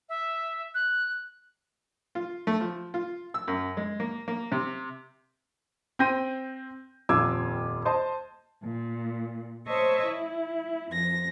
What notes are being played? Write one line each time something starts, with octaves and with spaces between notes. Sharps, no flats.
E5
F#6
F4
A3
F3
F4
E6
F#2
G#3
A#3
A#3
C3
C4 G5 C6 G6 A#6 D#7
D#1 F2 F4 D6 E6 G#6
C5 D#5 A5
A#2
C5 C#5 D#5 E5 A5 C#6
E4
F2 A#6